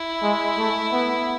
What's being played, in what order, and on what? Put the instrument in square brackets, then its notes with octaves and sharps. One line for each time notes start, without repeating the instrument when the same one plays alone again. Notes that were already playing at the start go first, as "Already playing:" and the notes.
Already playing: [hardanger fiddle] E4
[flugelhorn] G#3
A3
B3